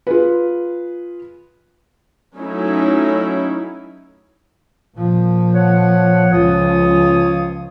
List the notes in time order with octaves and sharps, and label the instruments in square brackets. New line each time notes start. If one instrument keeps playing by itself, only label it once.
[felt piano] F4 G#4 B4
[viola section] F#3 A3 C#4 D#4 E4
[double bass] A#2 F3
[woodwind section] C#5 F#5
[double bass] C#2 F3 [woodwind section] F4 C#5 D#6